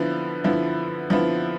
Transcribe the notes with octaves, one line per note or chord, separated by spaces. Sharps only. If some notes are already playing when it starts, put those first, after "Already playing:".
Already playing: D3 F3 B3 E4
D3 F3 B3 E4
D3 F3 B3 E4